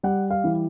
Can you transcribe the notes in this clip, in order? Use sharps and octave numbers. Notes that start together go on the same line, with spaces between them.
G3 F#5
F5
E3